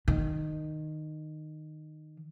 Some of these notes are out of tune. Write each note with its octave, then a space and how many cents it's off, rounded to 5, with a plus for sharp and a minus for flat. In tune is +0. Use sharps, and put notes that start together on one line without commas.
D#3 -15